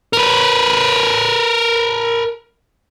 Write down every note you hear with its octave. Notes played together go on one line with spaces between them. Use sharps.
A#4 B4